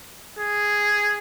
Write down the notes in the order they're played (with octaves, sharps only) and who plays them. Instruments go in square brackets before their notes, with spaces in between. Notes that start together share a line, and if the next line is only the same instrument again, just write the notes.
[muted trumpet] G#4